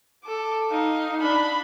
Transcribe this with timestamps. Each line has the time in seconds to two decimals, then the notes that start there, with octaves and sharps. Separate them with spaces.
0.24 A4 D6
0.71 D#4 F5
1.20 D4 B5